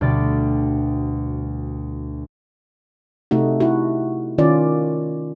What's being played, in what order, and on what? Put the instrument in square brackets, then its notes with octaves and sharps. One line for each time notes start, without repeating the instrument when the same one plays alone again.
[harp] D2 B2 G3 D5 F6 A6
[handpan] C3 A3 D#4 F#4
E4 F#4
D#3 C#4 F4 D5